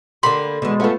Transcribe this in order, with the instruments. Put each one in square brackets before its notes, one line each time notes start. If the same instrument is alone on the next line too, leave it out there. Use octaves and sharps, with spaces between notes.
[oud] D3 A#3 G4 [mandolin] B5 C6
[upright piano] B2 [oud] D3 E3 [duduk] G#3
[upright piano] A3 B3 F4 [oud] C#4 A4